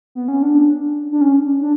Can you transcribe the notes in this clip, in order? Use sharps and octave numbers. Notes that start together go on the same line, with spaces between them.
B3
C#4
D4
D4
C#4
D4